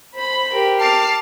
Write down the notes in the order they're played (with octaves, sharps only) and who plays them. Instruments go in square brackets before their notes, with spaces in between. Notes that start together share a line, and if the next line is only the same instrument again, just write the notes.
[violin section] C5 B5
[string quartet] G4 A#4
[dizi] A5 [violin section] D6 F6 C7